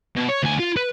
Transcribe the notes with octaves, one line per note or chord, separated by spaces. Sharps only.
B2
C#5
D2 G#5
F4
B4